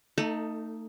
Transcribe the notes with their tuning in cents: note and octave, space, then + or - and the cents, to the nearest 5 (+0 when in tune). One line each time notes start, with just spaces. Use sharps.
A3 +35 D#4 +0 A4 +5